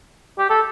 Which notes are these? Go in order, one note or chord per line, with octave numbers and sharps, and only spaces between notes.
G4
A4